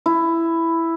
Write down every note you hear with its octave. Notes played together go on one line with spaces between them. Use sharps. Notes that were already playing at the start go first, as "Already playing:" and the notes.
E4